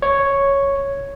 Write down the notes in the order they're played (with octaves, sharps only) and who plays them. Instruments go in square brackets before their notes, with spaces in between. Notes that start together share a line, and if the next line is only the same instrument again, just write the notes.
[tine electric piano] C#5